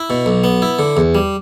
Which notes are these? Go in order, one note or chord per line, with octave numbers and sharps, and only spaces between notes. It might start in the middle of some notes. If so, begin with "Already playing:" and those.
Already playing: E4
B2
B1
B3
E4
D3
E2
G3